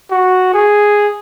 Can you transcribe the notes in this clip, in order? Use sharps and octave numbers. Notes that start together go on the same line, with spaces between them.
F#4
G#4